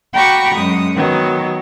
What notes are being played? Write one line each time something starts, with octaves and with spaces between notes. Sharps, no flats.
F#4 G5 A#5 B5 C#6 D6
F#2 G#3 D#6
D#3 F#3 B3